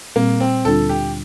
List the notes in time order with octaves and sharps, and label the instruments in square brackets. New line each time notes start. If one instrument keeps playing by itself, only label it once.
[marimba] A#2 G3 C4 [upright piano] A#3
[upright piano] C4
[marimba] D2 D3 G3 D4 F4 [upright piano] A4
[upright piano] G4